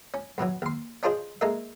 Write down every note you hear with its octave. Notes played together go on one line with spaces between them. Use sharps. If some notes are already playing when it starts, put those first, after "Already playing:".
C#4
G2 B2 E3 F#3
D#2 C6
C#4 D4 F4 G#4 C5 D#5
G#3 A#3 D#4 A4 E5